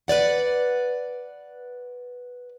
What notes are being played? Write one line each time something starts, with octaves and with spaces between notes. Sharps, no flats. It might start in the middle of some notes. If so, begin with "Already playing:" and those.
B4 C#5 D5 F#5